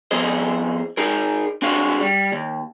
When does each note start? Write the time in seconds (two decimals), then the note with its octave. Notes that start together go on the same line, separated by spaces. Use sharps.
0.11 F3 B3 C4 G#4 C5 D#5
0.97 D#4 G#4 A#4
1.62 C4 D4 F4 F#4 G#4 F5
2.01 G3
2.32 D#2